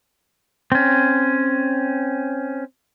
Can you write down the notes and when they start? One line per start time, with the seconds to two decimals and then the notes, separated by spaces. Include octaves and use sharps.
0.72 C4 C#4